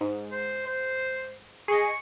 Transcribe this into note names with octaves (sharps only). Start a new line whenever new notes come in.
G#2
C5
C5
G#4 D#5 C#6